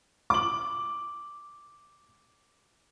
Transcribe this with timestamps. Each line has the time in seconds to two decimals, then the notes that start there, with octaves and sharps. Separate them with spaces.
0.30 D6 F#7